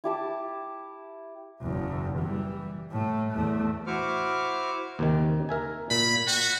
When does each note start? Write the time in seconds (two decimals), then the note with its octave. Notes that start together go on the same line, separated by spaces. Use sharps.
0.04 E4 G4 A5
1.61 F#1 E2
2.18 E3 G3
2.91 A2 A3
3.31 E2 A3
3.87 E4 F#4 C5 C#6 D6 F6
4.99 D#2 C3 D#3
5.49 A#4 E5 G#5
5.90 A#2 B5
6.27 F#4 G5